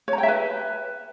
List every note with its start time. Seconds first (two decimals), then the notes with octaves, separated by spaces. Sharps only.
0.08 C#5
0.13 A#5
0.18 G5
0.23 E5
0.28 B4